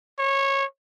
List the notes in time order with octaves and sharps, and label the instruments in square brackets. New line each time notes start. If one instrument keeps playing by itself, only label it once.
[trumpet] C#5